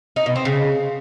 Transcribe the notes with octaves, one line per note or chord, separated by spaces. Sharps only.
D#4
B2
C4
C#3